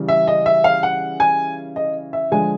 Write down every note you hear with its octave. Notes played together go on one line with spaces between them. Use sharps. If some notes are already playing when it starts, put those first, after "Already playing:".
Already playing: C#3 E3 G3
E5
D#5
E5
F5
F#5
G#5
D#5
E5
D3 F3 G#3 G#5